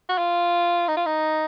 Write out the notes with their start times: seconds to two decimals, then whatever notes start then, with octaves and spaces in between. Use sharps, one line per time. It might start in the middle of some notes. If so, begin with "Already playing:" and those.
0.09 F#4
0.18 F4
0.88 D#4
0.97 F4
1.06 D#4